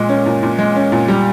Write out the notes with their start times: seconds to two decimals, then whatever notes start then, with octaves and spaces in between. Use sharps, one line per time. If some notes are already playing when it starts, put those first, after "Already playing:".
Already playing: A#2 G#3
0.09 C#4
0.26 A#2
0.43 A#2
0.59 G#3
0.76 C#4
0.92 A#2
1.08 G3